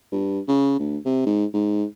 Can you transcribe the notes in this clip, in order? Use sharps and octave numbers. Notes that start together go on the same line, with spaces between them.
G2
C#3
D2
C3
G#2
G#2